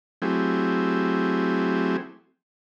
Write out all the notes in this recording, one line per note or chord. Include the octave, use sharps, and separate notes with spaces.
F#3 A3 C4 E4 G4 G#4